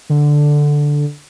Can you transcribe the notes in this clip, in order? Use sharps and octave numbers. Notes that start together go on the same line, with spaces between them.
D3